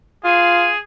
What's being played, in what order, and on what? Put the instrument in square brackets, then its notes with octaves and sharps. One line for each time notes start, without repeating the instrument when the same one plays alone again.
[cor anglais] F4 [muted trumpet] G#4